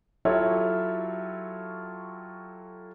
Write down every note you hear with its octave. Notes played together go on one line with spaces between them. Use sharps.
F#3 E4 F4 G4 A4 C#5